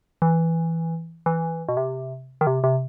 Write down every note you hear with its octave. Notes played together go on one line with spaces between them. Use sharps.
E3
E3
B2
C3
D#3
C3
C3